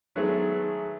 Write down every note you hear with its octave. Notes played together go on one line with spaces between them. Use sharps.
D#3 F#3 G#3 A3 B3 G#4